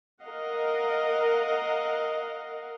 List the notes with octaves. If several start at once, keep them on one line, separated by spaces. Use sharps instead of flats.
A#4 D#5 F5 F#5